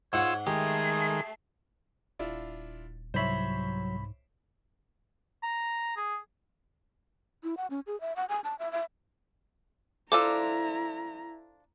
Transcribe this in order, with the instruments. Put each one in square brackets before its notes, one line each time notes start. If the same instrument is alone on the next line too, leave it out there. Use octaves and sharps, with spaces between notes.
[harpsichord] G#2 F#5 [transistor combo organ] F4 E6 [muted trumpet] C#5
[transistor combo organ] D#3 G#3 [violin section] A3 C7 [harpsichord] G4 [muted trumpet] G#4
[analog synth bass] D#1 [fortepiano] D4 E4 F4
[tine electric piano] C2 B5 [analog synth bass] G#2 [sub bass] F#3 [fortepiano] C5 C#5 E5
[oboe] A#5
G#4
[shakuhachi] E4
F#5
C#4
G#4
E5
F#5
G#5
A5
E5
E5
[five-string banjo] D4 F4 C5 [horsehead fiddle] E4 A#5 [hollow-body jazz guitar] A4 [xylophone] D6 E6